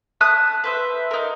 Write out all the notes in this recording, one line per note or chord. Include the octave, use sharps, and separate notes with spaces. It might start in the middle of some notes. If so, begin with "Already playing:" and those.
E5 A5 D#6 F#6
B4 C5 E5
D#4 A#4